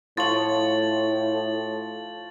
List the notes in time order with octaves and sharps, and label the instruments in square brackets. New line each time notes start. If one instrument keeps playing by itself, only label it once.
[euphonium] A2 [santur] F3 C#5 C6 [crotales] A6 F#7